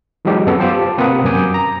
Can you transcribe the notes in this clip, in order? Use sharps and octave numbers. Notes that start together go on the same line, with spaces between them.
E3 F#3 G#3 D#4 G4
F#2 B3 A4
F4 G4 C5 A5 D6
C3 A#3 C4 B4 F#5 D#6
F#2 A#4 G#5 D6 D#6 G6
A#5